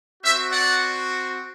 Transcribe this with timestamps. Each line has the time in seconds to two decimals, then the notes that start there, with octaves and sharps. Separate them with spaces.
0.22 C4 F#4 C5 E5
0.51 D5 F#5